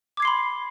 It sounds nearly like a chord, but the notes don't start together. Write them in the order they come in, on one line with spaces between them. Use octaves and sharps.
D6 G#6 C7 C6 B5